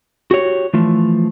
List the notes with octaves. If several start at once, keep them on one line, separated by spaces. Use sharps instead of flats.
F#4 G4 C#5
E3 F3 A3